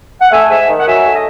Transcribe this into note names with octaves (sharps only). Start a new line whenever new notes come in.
F#5
A3 E5 G#5
G#2 E5 G#5
D#3
F#5
F#3 E5 G#5
A3
D#5